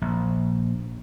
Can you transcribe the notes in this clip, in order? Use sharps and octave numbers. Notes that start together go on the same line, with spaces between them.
A#1